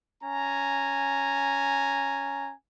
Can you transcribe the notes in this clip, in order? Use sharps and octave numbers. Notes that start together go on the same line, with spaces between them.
C#4 G#5 A#5